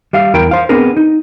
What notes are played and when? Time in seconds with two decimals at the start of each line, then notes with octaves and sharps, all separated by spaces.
0.13 G3 E5 F5
0.34 E2 E3 A#4 G5
0.51 C5 F5
0.69 B3 C4 D4 G#4 A#4
0.97 D#4